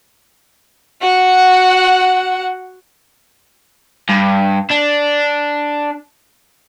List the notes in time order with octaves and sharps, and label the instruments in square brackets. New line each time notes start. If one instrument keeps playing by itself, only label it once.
[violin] F#4 F#5
[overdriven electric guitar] G2
D4